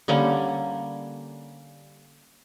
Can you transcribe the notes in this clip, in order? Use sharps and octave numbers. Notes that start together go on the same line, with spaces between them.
D3 G3 A#3 C#4